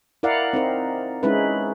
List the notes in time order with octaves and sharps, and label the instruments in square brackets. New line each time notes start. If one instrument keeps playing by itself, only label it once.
[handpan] E4 A#4 D5 F5 F#5
C4 D#4 A#4
G#3 C#4 D#4 E4 B4